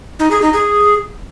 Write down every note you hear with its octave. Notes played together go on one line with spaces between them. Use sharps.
D#4
G#4
D#4
G#4